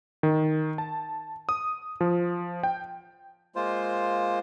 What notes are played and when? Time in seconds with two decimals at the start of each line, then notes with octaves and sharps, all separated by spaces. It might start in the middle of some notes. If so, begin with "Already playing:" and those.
0.23 D#3
0.78 A5
1.49 D#6
2.01 F3
2.63 G5
3.56 G#3 A#3 F4 C5